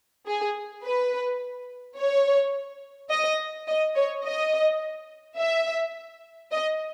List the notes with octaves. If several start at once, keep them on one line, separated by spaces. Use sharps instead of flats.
G#4
B4
C#5
D#5
D#5
C#5
D#5
E5
D#5